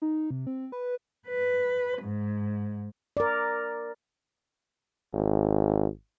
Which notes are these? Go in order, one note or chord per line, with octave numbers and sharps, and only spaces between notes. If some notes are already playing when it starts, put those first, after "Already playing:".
D#4
C3
C4
B4
B4
G#2
A#4 D5
G#1